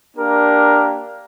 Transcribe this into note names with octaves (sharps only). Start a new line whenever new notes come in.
A#3 D4 G4 A#4